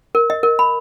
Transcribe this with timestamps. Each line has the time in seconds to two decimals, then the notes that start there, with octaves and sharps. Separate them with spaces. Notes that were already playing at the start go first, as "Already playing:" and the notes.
0.15 A#4
0.30 D#5
0.43 A#4
0.59 B5